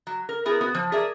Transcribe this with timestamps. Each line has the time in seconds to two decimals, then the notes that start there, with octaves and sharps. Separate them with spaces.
0.07 F#3
0.29 A#4
0.45 B3 E4 G#4 A#4
0.61 B3 F#4
0.75 F3
0.92 G#4 A#4 D5 E5